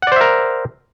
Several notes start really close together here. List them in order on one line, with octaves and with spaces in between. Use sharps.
F#5 D5 C5 E5 A#4